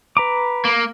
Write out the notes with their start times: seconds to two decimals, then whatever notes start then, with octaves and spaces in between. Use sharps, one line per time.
0.17 B4 A#5 D6
0.65 A#3